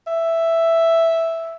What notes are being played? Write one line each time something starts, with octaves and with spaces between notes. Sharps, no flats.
E5